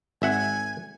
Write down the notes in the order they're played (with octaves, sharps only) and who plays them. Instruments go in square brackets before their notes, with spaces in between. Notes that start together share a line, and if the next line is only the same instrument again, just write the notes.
[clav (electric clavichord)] G#1 E5 F#5 [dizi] G#5